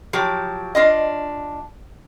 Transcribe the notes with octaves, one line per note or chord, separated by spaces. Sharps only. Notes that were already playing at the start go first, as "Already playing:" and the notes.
F3 F#3 G4
D4 F4 D#5